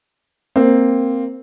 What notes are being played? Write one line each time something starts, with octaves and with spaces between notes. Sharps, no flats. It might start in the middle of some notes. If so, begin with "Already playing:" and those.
A#3 C4